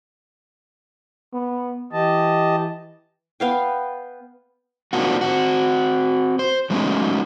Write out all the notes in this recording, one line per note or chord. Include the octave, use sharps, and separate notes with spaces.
B3
E3 G4 D#5 A5
B3 F5 G5
A#3 C4 D4 D#4 F4 F#4
C4 F#4
C5
F#3 G#3 A3 B3 C#4 D#4